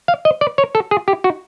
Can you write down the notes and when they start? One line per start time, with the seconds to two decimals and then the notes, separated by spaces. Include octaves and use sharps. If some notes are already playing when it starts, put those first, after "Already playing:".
0.08 F5
0.25 D#5
0.41 D5
0.58 C#5
0.75 A4
0.91 G#4
1.08 G4
1.24 F#4